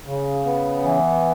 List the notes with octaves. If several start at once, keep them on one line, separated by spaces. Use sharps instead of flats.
C#3
B3
E3